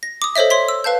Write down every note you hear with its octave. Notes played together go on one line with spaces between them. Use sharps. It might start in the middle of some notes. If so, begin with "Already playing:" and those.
A#6
D6 D#6
A4 C5 C#5 D#5 E5
C#5 C6 B6
E6
B4 F5 A5 G6